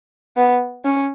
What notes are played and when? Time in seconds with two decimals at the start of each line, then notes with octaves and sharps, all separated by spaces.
0.37 B3
0.85 C#4